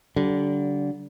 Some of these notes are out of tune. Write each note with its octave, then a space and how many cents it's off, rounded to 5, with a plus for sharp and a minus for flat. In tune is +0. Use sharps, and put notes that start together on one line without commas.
D3 -25 G3 -45